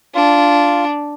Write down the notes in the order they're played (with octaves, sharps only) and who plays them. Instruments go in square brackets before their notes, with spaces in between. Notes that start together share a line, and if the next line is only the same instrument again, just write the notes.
[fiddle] D4 [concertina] F4